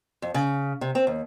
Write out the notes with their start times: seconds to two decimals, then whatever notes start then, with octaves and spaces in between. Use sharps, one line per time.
0.22 F2
0.34 C#3
0.81 C3
0.95 C4
1.07 D#2